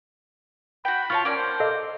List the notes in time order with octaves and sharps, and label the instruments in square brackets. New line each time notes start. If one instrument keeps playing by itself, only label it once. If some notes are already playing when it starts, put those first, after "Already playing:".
[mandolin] F#4 G5 [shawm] B5
[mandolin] F4 C#5 A5 [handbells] C#6 F6
[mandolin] A#3 D5 [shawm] C#4
[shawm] C5
[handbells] A4 D#5 F5